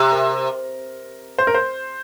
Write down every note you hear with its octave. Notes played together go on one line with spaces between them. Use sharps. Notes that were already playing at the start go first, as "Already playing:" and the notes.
Already playing: C3
A#4
C5
A#4
C5